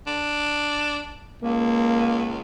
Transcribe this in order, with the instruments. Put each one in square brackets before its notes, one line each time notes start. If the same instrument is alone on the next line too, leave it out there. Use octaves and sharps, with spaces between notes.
[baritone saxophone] D4
[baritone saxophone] C#2 [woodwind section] A#3